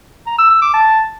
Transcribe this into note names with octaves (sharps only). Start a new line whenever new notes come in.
A#5
E6
E6
D6
A5